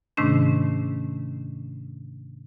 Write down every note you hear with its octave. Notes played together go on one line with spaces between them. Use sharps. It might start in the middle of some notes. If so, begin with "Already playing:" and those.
G#2 C3 D#3 A3 C#4 D4